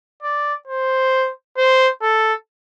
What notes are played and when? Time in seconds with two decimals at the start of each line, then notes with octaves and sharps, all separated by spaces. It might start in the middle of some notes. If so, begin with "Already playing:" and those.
0.23 D5
0.67 C5
1.57 C5
2.02 A4